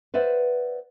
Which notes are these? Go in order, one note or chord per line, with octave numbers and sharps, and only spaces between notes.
B4 C5 D5 E5 F#5